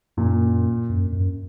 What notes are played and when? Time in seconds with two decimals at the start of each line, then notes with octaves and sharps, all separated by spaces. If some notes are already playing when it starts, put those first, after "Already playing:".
0.17 F#2 A#2
0.90 F#2
1.12 F#2